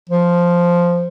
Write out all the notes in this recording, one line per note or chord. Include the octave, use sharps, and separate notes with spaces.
F3